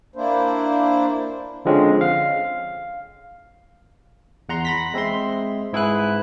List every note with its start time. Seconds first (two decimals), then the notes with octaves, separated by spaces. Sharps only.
0.16 A#3 D4 E4 C5
1.65 D3 F3 G#3 C4 C#4
2.01 F5
4.49 E2 F#5 A#5 C6
4.65 B5 A#6 B6
4.94 G#3 C4 E5 C6
5.73 G#2 E4 G#4 B4 F#6